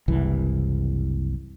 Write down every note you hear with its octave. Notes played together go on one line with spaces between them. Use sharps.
F#1 C2 E3